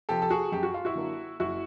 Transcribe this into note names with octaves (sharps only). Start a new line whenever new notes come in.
C3 F3 G4 A4
A4
F#4 G#4
F#2 G4
F#4
F4
E4 F#4
D3 F#3 A#3
F#1 E4 F#4